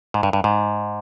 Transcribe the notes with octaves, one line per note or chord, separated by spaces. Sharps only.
G#2
G2
G2
G#2